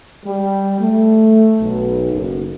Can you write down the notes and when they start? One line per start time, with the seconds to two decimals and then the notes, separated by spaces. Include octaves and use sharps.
0.25 G3
0.79 A3
1.60 B1
2.11 F#1